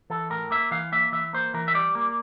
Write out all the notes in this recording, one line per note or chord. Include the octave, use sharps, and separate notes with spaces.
E3 A4
A2 A#4
A#3 E5
E3 F5
A#3 E5
E3 E5
A#3 C5
E3 A#4
E5
G3 D5
A#3